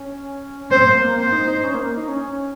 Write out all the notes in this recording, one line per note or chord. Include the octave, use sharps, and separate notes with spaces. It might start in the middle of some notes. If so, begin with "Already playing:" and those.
Already playing: C#4
C4 C5
A#3
A#3
C4 C5
D#4
D#4
C#4
A#3
D#4
C#4